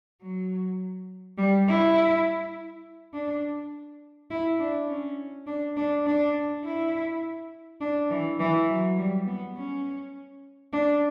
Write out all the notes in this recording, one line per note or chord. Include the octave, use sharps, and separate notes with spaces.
F#3
G3
E4
D4
E4
D4
C#4
D4
D4
D4
E4
D4
E3
E3
F#3
G3
B3
C#4
D4